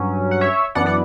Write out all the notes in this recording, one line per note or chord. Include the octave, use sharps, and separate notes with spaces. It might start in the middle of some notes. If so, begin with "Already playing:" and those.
Already playing: G2 F#3 C#4
F#5
C#5 E5
F#2 E3 B3 D4 D5 F#5
D5 F#5